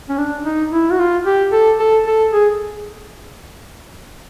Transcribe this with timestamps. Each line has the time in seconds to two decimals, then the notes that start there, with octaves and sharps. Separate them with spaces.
0.09 C#4
0.18 D4
0.45 D#4
0.72 E4
0.92 F#4
0.99 F4
1.26 G4
1.52 A4
1.80 A4
2.07 A4
2.33 G#4